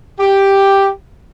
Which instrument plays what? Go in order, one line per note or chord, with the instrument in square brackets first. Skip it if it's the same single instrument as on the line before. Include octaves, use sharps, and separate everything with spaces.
[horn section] G4